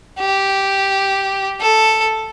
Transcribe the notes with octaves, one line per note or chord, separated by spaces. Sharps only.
G4
A4